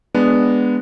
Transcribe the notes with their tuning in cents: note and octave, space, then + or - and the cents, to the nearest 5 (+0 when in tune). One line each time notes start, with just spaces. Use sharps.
G#3 -10 B3 +0 D4 +0